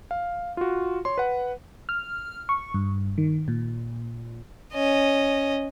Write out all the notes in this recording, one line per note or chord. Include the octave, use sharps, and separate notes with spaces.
F5
F4 F#4
C#5 C6
B4 F#5
F6
C#6
G2
D#3
A#2
C#4 D#5